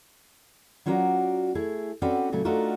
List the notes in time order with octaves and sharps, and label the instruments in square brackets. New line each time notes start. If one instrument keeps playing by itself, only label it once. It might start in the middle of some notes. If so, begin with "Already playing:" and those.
[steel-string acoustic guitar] F#3 C#4 F4 F#4 A#4 D5
A3 E4 G#4
C4 C#4 F#4 A4 B4 D5
A#2 C#3 F#3 A3
A3 D4 D#4 F4 F#4 A#4